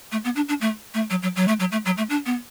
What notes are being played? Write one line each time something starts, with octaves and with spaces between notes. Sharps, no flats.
A3
B3
D4
D4
A3
A3
F#3
F#3
F#3
A3
F#3
A3
F#3
A3
D4
B3